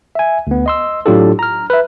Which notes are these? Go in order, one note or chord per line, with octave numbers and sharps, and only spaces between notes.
E5 G#5
D2 B3
D#5 C6 E6
A2 F#3 D4 F4 G4 A4
A#5 F6
B4 E5